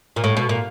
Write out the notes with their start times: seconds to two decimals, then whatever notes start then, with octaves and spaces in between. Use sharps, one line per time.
0.16 A#2
0.24 A2
0.37 B2
0.49 A#2